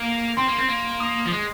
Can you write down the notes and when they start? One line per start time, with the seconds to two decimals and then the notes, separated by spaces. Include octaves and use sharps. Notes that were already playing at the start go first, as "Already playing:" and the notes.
Already playing: A#3
0.37 C4 C6
0.47 A#3
0.58 C4
0.68 A#3
1.00 D#6
1.25 F3
1.31 G#3